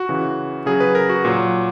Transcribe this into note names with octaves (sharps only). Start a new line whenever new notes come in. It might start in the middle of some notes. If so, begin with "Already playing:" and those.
Already playing: F#4
C#3 E3
C#3 F#3 G#4
B4
A#4
F#4
A#2 F#3